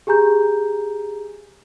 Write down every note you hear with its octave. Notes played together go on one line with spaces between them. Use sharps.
G4 G#4 G#5 A#5 G6